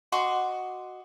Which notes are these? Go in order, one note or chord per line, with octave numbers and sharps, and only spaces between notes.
F#4 D#5 C6 D6